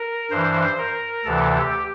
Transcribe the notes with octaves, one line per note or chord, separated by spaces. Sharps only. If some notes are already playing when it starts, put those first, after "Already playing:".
Already playing: A#4
G2 E3 C5
A#4
D2 C3 E3 A4
G4